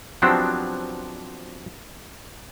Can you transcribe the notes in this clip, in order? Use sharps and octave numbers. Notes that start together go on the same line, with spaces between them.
F3 F#3 B3 C4 D4 G4